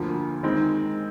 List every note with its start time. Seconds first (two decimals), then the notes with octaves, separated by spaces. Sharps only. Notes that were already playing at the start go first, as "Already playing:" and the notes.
Already playing: D2 D3 F3 A#3
0.43 D#3 G#3 C4 D#4